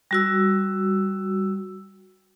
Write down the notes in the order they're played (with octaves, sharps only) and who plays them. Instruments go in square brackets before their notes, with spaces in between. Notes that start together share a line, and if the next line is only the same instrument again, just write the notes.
[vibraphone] G3 F#4 E6